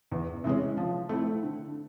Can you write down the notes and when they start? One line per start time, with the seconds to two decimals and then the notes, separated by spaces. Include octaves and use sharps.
0.12 E2
0.44 C3 E3 G#3 C#4
0.77 F3
1.09 A3 C4 E4
1.43 D3